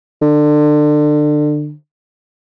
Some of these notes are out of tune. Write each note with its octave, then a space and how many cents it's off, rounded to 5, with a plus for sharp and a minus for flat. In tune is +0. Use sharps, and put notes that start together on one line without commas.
D3 +25